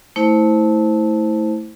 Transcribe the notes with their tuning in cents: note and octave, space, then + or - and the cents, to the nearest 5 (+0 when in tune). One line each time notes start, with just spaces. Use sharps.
A3 +0 E4 -25 C5 +0